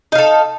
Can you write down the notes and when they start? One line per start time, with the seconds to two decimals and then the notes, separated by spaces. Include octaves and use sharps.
0.12 D#4
0.15 F5
0.18 A4